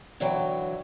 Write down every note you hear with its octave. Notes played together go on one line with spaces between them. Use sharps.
D3 E3 F#3 G5